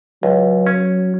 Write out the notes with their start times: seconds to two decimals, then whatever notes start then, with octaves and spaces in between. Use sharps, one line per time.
0.23 C#2 F#3
0.67 C#4